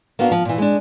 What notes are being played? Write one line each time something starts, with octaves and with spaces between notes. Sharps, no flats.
A#3 B3 D4 F#4 F5
F3
A#2 E3
G#3 D4